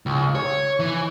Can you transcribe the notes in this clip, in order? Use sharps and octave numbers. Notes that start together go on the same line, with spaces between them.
C#2
C#5
E3